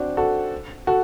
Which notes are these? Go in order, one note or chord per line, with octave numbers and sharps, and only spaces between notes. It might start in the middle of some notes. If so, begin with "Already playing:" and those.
Already playing: C4 D4 F#4
F#4 A4
F#4 A4